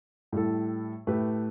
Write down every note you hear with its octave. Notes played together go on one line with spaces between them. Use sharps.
A2 G3 E4 A4
A2 A3 G4 B4